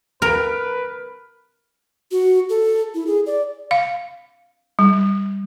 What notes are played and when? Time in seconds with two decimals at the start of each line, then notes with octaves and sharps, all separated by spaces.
0.22 A#4 B4 F6 D7
2.11 F#4
2.49 A4
2.94 E4
3.07 G#4
3.26 D5
3.71 F5
4.79 G3